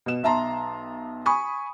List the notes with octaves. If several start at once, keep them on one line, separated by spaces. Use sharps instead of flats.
B2 E7
B1 E5 A5 A#5 C6
G#5 B5 C#6 D#6